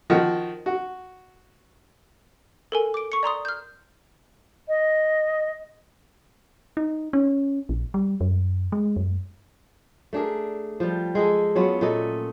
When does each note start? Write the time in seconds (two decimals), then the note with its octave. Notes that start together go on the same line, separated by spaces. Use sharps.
0.10 D#3 F3 F#4
0.66 F#4
2.72 A4 A#4 G#5
2.94 D6 D7
3.12 C#6 C#7
3.23 D5 A#5 C6 D#6
3.45 F6 G6
4.68 D#5
6.77 D#4
7.13 C#4
7.69 A#1
7.94 G3
8.21 F#2
8.72 G#3
8.96 F#2
10.13 A3 D4 G#4 A#4
10.80 F3 G3
11.15 G#3 G#4 A4
11.56 F#3 B3 C#4 F4
11.81 A#2 A3 A4 D#5